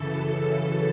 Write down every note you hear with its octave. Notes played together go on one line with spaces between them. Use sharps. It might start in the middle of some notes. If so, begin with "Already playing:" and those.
Already playing: F#2 C#3 E3 A4